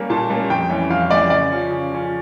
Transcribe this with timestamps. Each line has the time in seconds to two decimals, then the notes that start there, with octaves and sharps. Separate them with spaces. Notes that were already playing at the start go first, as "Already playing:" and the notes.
Already playing: G3 A#3 C#4
0.10 A#2 A5
0.30 G3 A#3 C#4
0.50 F2 G5
0.70 E3 G3 C#4
0.90 F2 F5
1.10 E3 G3 C#4 D5
1.30 C#3 D5
1.50 F3 C#4
1.70 C#3
1.90 F3 C#4